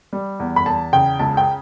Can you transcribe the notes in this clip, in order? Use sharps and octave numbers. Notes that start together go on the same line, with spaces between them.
G3
E2
B5
E2 A5
C#3 G5
C#2 A5
G5